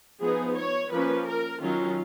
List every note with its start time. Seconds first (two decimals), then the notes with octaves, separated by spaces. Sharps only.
0.21 F3 B3 D#4 G#4
0.56 C#5
0.92 F3 A#3 C#4 B4
1.27 A#4
1.62 D#3 F#3 C#4 F4